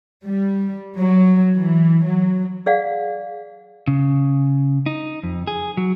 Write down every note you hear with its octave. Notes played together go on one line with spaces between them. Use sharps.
G3
F#3
E3
F#3
G#4 D5 F5 F#5
C#3
D#4
F2
G#4
F#3